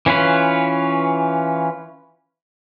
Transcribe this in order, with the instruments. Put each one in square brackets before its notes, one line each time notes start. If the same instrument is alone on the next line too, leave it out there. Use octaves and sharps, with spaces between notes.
[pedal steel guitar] E3 C#4 F4 B4